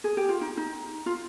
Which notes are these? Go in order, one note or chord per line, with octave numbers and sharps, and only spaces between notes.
G#4
G4
F4
D#4
D#4
F4